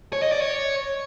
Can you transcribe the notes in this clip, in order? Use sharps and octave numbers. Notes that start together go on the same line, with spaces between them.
C#5
D#5
D5
C#5